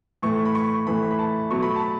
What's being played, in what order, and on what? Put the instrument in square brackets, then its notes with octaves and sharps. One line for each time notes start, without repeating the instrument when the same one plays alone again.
[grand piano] A2 E3 A3 C#6
B5
C#6
A2 E3 A3 B5
B5
A5
B2 F#3 A3 C#6
B5
A5